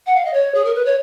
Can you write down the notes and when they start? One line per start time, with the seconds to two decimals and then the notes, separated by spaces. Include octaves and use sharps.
0.06 F#5
0.16 F5
0.25 D#5
0.34 C#5
0.54 G#4
0.65 A#4
0.75 B4
0.85 C#5